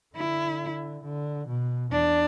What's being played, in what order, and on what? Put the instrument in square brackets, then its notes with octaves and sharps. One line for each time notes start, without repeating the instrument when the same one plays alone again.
[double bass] D3 [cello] E4
[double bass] D3
B2
[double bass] E2 [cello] D4